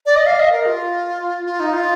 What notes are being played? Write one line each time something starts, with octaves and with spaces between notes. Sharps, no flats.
D5
D#5
F5
D#5
A#4
F4
F4
D#4
F4